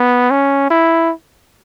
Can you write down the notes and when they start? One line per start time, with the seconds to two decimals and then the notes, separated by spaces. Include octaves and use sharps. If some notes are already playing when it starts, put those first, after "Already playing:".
Already playing: B3
0.31 C#4
0.71 E4